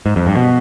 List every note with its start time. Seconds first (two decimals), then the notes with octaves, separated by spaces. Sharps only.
0.06 G#2
0.16 F2
0.27 G2
0.37 B2